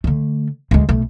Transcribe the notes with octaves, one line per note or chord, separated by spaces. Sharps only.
D3 A3
D2 G#3
B1 A3